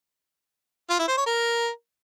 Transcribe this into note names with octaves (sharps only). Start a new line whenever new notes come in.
F4
E4
C5
C#5
A#4